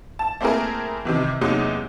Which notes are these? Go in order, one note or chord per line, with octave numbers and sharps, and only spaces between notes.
A5
A3 A#3 C4 E4 G#4 A#4
C3 D#3 E3
E2 C3 F#3 G#3 A#3 D#4